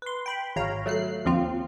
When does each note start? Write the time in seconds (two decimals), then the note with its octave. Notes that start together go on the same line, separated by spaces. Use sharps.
0.02 B4 C6
0.26 G5 B5
0.56 G#1 C#5 F5 A#5
0.86 F#3 A3 F#6 C7
1.25 D#2 F3 C4 F4